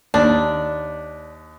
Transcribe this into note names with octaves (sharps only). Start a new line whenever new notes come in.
D#2 D4